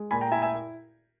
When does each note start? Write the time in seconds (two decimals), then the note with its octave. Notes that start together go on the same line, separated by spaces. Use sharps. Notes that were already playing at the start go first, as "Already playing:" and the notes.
Already playing: G#3
0.11 A#2 G#5 B5
0.21 G5 A#5
0.32 E4 E5 G#5
0.42 E5 G#5